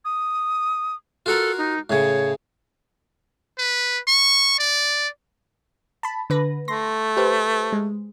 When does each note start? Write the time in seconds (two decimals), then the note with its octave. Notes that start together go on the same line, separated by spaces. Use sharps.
0.05 D#6
1.26 F4 F#4 A4 A#4
1.58 D#4
1.90 A2 C#3 C#5
3.58 B4
4.08 C#6
4.59 D5
6.03 A5 B5
6.30 D3 B4 A#6
6.68 A3 C6 A#6
7.17 G4 B4 C5
7.73 G#3